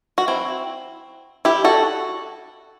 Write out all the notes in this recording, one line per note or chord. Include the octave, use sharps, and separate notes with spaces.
F#4
C4 E4
E4 G4
F#4 A4